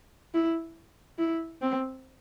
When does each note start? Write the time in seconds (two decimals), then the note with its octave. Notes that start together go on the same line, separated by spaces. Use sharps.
0.34 E4
1.18 E4
1.62 C4